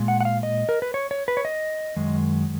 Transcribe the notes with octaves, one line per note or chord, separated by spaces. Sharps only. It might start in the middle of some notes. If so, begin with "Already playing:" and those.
Already playing: A#2 G#3
F#5
F#5
F5
D#5
A#4
B4
C#5
C#5
B4
C#5
D#5
F#2 D#3 G#3